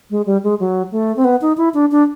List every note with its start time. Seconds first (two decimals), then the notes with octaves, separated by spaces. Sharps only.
0.10 G#3
0.26 G3
0.43 G#3
0.60 F#3
0.92 A3
1.17 C4
1.25 B3
1.41 D#4
1.57 E4
1.74 D4
1.91 D4